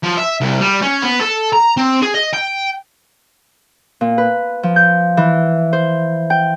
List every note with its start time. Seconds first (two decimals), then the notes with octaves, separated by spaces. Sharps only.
0.04 F3
0.18 E5
0.41 C2
0.61 G3
0.82 C#4
1.03 B3
1.21 A4
1.53 A#5
1.77 C4
2.02 G#4
2.14 D#5
2.33 G5
4.01 A#2
4.18 B4
4.63 F3
4.76 G6
5.17 E3
5.73 C5
6.30 G5